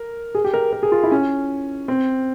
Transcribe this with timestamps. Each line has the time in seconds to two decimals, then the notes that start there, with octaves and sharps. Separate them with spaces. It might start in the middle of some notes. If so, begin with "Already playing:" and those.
Already playing: A#4
0.35 G#4
0.44 G4
0.54 A#4
0.73 A#4
0.83 G#4
0.92 F4
1.03 E4
1.12 C#4
1.88 C4